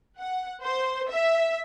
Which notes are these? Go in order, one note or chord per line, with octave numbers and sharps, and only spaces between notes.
F#5
C5
E5